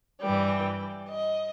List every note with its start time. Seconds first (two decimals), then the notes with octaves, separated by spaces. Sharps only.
0.22 G2 E3 G3 G5
1.10 D#5